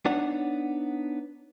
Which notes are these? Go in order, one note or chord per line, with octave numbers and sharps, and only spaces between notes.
B3 D4 D#4 C#5 F#5